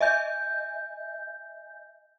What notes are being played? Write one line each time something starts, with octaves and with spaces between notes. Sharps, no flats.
D#5 E5 G#5 G6